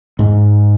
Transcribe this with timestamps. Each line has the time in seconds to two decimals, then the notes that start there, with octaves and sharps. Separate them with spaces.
0.19 G#2